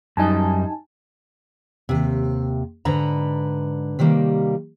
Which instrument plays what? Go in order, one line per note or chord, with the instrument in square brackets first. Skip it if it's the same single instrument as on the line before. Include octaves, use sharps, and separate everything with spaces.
[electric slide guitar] F#2 G3 D#5 [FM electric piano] D#4 G#5 A5
[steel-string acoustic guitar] D#2 C3
G#2 D3 B4 A#5
C3 D#3 G3 A#3